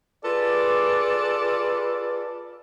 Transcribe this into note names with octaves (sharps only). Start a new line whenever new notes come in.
F4 G#4 A4 B4 D5